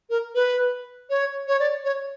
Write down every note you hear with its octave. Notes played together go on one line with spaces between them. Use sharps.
A#4
B4
C#5
C#5
D5
C#5